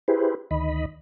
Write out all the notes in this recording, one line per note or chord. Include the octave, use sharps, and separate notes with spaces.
E4 G4 G#4 B4 C5
D2 D#3 D#5 B5